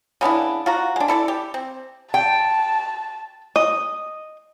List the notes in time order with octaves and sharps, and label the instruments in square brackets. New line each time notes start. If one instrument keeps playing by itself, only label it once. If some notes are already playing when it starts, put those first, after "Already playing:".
[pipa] C#3 B3 D4 E4
F4 F#4 A#5
G#3 D4
E4 A4 C#5 D5
G4
C4
[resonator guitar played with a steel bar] G5 [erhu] A5
[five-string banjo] D#5